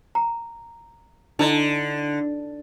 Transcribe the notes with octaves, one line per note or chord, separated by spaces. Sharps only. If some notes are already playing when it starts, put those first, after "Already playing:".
A#5
D3 D#4 E4 D#5